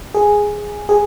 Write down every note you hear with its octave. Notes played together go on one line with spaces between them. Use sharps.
G#4
G#4